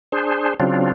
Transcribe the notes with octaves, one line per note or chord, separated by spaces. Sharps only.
D4 G#4 C5
C#3 F#3 C4 D4 F4